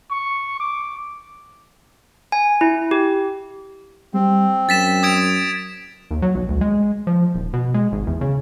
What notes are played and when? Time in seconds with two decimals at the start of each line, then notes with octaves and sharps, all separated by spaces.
0.11 C#6
0.60 D6
2.32 G#5
2.61 E4
2.91 G4
4.14 G3 C4
4.69 F#2 A6 B6 E7
5.03 D#6 G#6 D7
6.11 D#2
6.22 F#3
6.35 B1
6.49 D2
6.61 G#3
7.07 F3
7.35 D#1
7.53 B2
7.74 G#3
7.92 G#1
8.07 E2
8.21 C#3